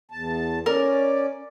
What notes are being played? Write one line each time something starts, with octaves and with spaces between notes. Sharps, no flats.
E2 A5
C#4 A#4 D5